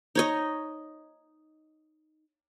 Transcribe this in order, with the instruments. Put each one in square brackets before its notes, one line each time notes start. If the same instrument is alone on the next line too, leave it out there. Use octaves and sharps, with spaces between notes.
[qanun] D#4 C#5 D#5